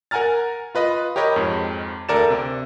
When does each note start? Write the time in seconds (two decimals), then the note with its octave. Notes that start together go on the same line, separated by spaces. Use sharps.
0.11 A#4 F#5 G#5 A#5 F6 A6
0.75 F4 B4 D#5 B5
1.16 G4 A#4 C#5 D#5 B5
1.36 F2 G#2
2.09 D2 A4 A#4 D5 A6 E7
2.30 C3